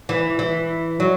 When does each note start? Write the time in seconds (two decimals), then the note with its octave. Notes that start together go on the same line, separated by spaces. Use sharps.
0.09 E3
0.39 E3
1.00 F#3